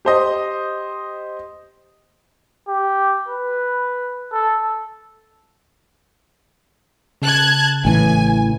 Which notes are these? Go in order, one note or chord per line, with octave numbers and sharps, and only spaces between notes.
G4 C5 D#5
G4
B4
A4
C#3 A5 F#6 G#6
A1 A2 E3 G#5